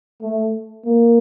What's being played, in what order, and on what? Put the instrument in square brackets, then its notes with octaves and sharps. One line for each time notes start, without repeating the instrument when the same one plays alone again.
[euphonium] A3
A#3